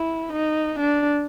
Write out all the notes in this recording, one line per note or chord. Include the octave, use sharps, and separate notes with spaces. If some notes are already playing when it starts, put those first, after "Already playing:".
Already playing: E4
D#4
D4